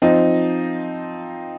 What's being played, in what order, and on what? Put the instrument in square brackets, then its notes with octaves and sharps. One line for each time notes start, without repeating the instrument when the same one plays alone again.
[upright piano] F3 C4 D#4